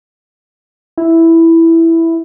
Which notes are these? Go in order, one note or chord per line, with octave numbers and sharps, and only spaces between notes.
E4